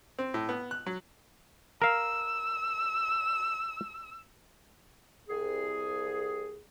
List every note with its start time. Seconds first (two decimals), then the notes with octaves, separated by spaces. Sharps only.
0.19 C4
0.34 A2
0.49 B3
0.71 F#6
0.86 F#3
1.82 A#4 F5 E6
5.29 C2 G#4